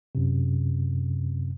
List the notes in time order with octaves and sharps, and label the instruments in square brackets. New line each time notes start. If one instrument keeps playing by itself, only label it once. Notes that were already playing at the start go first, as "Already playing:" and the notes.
[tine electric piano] F#2 C3